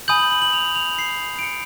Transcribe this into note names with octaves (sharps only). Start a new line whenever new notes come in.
G#5 B5 D#6 G6 F#7
F#7
F#7
F#7
F7
F7
C7
D7
C#7